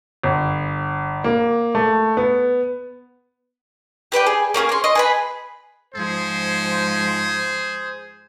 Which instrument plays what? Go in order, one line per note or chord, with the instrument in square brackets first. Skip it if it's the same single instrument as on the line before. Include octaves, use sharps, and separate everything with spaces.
[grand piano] G1
A#3
A3
B3
[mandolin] G4 B4 D5 G5
G#4
A#3 C#4 G4 G#4
C#5 C6
D#5 C6
G#4 B4 B5
[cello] G#2 F3 [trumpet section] G#4 C5